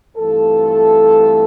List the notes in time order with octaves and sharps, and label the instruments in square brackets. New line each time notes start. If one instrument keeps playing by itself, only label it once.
[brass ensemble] G2 E3 A3 C4 F4 A4